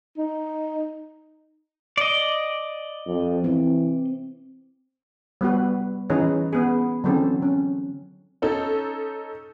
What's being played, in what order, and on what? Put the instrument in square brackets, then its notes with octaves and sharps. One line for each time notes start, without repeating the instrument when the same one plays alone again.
[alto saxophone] D#4
[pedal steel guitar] D5 D#5
[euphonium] F2
[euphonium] E3 [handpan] C4
[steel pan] G3 B3 F#4 B4
E3 C#4 D#4 G#4 B4 C#5
B3 G#4
D3 E3 F#3 C4 C#4 A4
C#4
[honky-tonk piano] C#4 D#4 A4